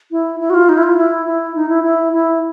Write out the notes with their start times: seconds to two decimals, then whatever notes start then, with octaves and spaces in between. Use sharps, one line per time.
0.11 E4
0.40 E4
0.50 F#4
0.54 F4
0.69 D#4
0.78 E4
0.83 F4
0.97 E4
1.26 E4
1.55 D#4
1.69 E4
1.84 E4
2.13 E4